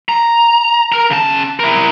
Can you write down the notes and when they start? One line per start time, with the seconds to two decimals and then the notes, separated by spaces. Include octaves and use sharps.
0.09 A#5
0.92 A#4 A#5
1.11 C#3 A5
1.60 E4 A#4